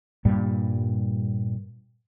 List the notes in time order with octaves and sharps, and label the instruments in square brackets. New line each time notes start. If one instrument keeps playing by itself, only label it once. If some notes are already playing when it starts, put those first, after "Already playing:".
[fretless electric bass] G2 A#2 G3